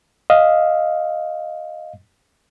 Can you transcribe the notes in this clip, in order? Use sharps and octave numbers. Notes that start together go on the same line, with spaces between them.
D#5 F5